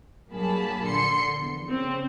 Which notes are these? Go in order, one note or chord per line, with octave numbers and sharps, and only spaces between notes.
G2 F#3 A#3 G#4 A5 B5
A#1 D3 C6 C#7
A#1 E2
C#3 C4